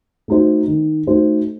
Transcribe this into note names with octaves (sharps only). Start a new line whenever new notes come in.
A3 D#4 F#4 C5
D#3
A3 D#4 F#4 C5